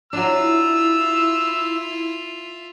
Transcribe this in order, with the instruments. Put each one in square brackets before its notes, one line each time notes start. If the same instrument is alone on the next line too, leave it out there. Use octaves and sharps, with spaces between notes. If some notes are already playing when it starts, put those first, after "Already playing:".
[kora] F#3 D4 [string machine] E4 [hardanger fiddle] F4 E5 [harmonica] E6